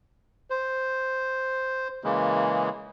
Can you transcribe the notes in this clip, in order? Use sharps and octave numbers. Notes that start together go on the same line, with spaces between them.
C5
C#3 E3 G#3 A#3